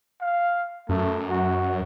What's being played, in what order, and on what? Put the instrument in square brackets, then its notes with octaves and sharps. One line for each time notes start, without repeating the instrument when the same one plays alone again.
[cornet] F5
[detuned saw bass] F#2 [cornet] A3
[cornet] F#4